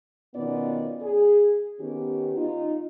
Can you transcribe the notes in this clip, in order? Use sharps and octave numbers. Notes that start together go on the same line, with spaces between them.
B2 D#3 B3 C#4 F4 D5
G#4
D#3 B3 C#4 G4
D#4 F4